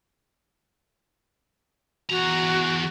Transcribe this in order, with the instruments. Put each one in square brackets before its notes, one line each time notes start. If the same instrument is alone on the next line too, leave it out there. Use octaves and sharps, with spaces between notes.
[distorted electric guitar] E2 A#5 [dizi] F#4